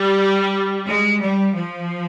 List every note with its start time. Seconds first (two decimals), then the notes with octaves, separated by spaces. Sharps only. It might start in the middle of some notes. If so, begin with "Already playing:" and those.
Already playing: G3
0.87 G#3
1.20 G3
1.54 F3